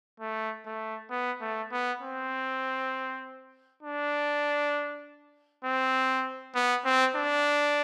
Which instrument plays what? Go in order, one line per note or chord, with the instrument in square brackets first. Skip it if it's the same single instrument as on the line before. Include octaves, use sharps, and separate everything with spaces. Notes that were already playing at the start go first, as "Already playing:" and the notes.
[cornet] A3
A3
B3
A3
B3
C4
D4
C4
B3
C4
D4